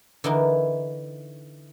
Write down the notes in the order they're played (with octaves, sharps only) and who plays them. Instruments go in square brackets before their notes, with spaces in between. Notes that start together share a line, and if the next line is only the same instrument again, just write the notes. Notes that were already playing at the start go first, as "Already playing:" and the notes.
[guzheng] D3 E3 D#4 E4 A#4